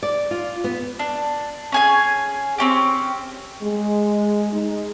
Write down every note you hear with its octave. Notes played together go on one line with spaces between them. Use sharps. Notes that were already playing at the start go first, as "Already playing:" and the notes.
D5
F4
B3
D4
C#4 G#4 G#5
C4 C#4 G4
G#3
G#3 D#4